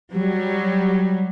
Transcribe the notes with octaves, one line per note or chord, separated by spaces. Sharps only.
F#3 G3